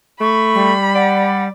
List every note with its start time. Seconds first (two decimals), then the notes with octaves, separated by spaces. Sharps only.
0.21 A3 B5 C#6
0.54 G3
0.95 D5 F#5